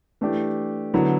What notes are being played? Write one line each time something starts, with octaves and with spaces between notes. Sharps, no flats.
E3 A3 D4 G4
D3 F#3 B3 E4